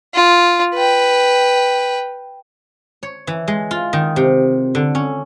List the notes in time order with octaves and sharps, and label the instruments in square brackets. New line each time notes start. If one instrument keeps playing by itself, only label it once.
[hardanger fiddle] F4
B4 G5
[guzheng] C#5
E3
G#3
F4
D#3
C3
D3
C#4